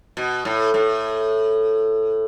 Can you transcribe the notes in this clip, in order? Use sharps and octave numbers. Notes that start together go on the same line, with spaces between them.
B2
A2
A2